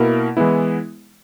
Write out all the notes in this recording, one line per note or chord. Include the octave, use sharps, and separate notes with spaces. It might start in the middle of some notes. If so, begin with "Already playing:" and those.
Already playing: B2 A#3 E4 A#4
E3 G#3 B3 E4